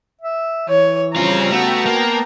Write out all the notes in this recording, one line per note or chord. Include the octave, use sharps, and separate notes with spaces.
E5
E3 C#5
C#3 G3 C4 C#4 F4 A#5
A3 B3 F#4 G5 A5
A#3